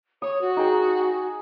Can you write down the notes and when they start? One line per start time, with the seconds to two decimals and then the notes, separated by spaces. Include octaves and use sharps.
0.22 C#5 D#6
0.41 F#4
0.57 D#4 G#4 G5